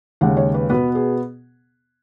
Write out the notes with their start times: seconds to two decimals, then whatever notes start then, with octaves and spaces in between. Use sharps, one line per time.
0.21 D#2 C#3 G#3 F#5
0.37 C#5
0.54 B4
0.70 B2 B3 B4
0.95 G#4